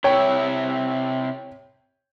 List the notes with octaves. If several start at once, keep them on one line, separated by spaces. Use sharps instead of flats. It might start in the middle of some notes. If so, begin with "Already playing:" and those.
C3 E4 C#5 G5